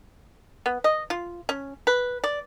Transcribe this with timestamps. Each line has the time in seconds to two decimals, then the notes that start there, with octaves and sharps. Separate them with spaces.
0.66 B3
0.84 D#5
1.10 F4
1.49 C#4
1.87 B4
2.24 D5